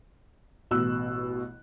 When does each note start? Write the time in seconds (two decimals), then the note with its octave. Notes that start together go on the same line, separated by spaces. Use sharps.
0.71 A1 B2 E6 F#6